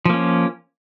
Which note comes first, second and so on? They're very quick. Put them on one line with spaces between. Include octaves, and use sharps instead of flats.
F3 A#3 C#4